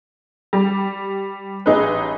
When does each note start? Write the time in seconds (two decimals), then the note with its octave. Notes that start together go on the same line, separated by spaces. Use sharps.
0.53 G3
1.66 A1 D#4 G#4 B4